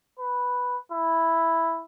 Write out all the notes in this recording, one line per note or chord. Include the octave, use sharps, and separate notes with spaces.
B4
E4